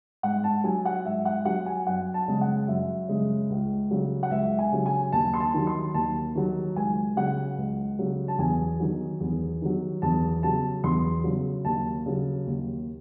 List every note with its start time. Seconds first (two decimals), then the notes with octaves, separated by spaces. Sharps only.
0.23 G#2 F#5
0.44 A5
0.64 F#3 G#5
0.85 F#5
1.05 G#2 E5
1.25 F#5
1.45 F#3 F#5
1.66 G#5
1.87 F#2 F#5
2.14 A5
2.28 C#3 G#3
2.41 F#5
2.68 F#2 E5
3.09 C#3 G#3
3.50 C#2
3.91 C#3 F#3
4.23 F#5
4.31 C#2 E5
4.59 G#5
4.72 C#3 F#3
4.86 G#5
5.12 D#2 A5
5.34 C6
5.40 A5
5.54 D#3 F#3
5.67 C6
5.94 D#2 A5
6.35 D#3 F#3
6.76 C#2 G#5
7.17 C#3 F#3 F#5
7.58 C#2
7.99 C#3 F#3
8.28 A5
8.38 E2 G#5
8.80 D#3 F#3
9.21 E2
9.62 D#3 F#3
10.02 E2 A5
10.43 C#3 F#3 A5
10.84 E2 C6
11.24 C#3 F#3
11.65 D#2 A5
12.06 C#3 F#3
12.47 D#2